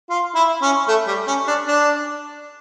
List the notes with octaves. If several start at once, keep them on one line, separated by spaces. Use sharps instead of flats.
F4
E4
C#4
A3
G3
C#4
D4
D4